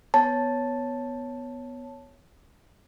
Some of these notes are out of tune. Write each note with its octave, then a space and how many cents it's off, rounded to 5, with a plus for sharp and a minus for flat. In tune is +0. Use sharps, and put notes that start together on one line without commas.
B3 +5 C#5 +5 A5 +0